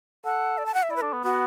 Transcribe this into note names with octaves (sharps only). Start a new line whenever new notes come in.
A4 F#5
D5
A5
F#5
E5
E4 D5
B4
D4 A4
B3
B3 F#4